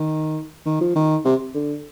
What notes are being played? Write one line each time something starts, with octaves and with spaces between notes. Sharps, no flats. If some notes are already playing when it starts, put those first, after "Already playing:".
Already playing: D#3
D#3
F3
D#3
C3
D3